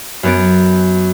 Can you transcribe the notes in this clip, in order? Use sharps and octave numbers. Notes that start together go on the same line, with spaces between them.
F#2 B3 C#4 A6 D7